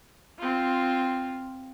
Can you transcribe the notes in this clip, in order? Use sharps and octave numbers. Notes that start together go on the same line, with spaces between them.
C4 F4